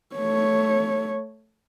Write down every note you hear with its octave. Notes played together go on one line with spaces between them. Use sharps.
A3 C#5